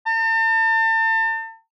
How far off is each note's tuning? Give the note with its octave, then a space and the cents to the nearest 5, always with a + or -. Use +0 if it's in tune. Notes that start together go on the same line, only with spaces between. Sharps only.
A5 +40